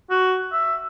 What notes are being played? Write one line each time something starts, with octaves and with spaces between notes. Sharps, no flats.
F#4
E5